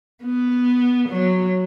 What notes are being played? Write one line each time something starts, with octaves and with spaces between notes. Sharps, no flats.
B3
F#3